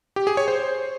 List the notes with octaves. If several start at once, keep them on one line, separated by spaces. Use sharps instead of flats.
G4
G#4
C#5
C5